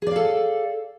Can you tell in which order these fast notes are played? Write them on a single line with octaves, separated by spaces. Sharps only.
G#4 D5 F5 A4